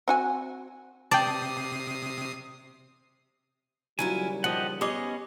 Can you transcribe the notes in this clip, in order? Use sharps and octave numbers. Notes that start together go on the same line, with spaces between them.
C4 F#4 G#5
C3 D5 G5 A5 D#6 C7
D#2 C#3 F#3 G3 E4 F4 G#5
F3 G4 D#5 F#5
B3 C#4 D#4 G4 G#4 D#5 D6